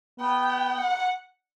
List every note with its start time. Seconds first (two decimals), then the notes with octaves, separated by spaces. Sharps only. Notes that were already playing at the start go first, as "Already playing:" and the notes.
0.20 B3 G5
0.78 F#5